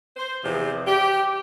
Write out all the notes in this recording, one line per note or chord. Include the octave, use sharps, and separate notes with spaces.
C5
E2 C3 F3
G4